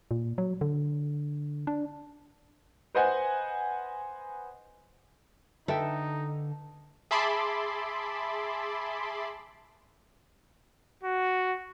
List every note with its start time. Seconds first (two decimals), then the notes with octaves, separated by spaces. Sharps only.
0.11 A#2
0.38 F#3
0.61 D3
1.67 D4
2.95 B4 C5 D#5 F#5 G#5
5.68 D3 D#4 A4 B4 E5 G5
7.11 G#4 E5 A5 B5 C6 D6
11.04 F#4